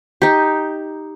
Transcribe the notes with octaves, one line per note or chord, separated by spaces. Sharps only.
D#4 G4